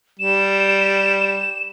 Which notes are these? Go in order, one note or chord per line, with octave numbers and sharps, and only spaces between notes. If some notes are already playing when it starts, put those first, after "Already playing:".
G3 E7